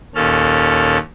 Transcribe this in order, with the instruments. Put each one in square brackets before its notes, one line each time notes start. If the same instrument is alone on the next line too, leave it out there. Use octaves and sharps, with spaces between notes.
[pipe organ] D#2 A#2 C#4 A4 F6